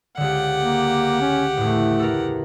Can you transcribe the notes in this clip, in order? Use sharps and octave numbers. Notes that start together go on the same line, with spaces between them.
C#2 D3 G4 F#5
A#3
C#4
E2 A2 A3
A4 A#4